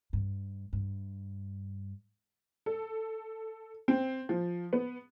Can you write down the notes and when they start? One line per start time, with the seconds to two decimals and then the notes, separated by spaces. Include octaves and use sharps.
0.13 G2
0.73 G2
2.66 A4
3.88 C4
4.29 F3
4.73 B3